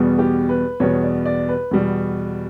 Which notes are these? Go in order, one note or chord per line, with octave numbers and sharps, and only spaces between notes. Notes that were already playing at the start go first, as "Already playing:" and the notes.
Already playing: E2 B2 G3 B3
G4
B4
E2 B2 G3 B3 C#5
D5
D5
B4
E2 B2 G3